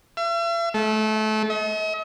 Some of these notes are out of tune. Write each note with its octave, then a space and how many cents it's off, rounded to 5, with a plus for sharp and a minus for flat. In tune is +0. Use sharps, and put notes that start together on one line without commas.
E5 +45
A3 -25
D#5 +45